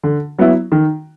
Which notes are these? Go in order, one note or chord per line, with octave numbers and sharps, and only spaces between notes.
D3
F#3 B3 E4
D#3